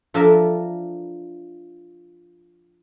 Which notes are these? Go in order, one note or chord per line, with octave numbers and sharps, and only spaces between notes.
F3 D4 A4 A#4 E5